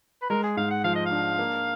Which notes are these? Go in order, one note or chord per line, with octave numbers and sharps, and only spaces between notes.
B4
G#3 A#4
G#4
G#2 F5
F#5
F3 F5
D#5
F5
D4
A#3